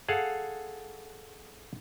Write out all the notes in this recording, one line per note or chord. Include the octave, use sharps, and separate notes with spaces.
G#4 A4 F5 F#5